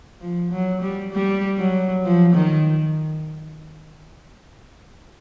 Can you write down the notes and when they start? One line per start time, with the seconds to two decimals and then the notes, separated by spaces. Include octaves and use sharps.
0.21 F3
0.51 F#3
0.82 G3
1.13 G3
1.58 F#3
2.04 F3
2.34 D#3